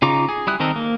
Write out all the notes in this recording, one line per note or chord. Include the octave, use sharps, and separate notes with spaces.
C#3 D#4 F4 A#5 D6
G#4
G3 E4 D#6 F#6
D#3 C4 A4 A#4 D#5
A#3